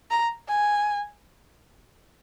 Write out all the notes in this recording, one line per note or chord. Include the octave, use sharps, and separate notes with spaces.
A#5
G#5